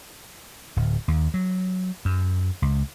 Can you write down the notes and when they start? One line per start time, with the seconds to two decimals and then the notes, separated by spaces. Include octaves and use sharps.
0.76 D1
1.08 D#2
1.34 F#3
2.05 F#2
2.62 C#2